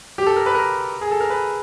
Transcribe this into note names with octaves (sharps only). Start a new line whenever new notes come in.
G4
A4
A#4
B4
A#4
G#4
A4
A#4
B4